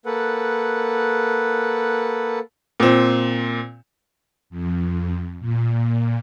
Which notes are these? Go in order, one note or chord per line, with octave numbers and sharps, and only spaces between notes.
A#3 A4 B4 F#5
A#2 C4
F2
A#2